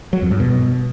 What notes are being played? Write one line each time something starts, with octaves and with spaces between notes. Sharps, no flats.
F#3
F2
G2
B2